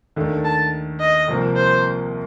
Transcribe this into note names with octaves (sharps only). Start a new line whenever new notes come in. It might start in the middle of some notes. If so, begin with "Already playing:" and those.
D#2 D#3 A3 D4 A4
A5
D#5
C2 C3 F3 A#3
C5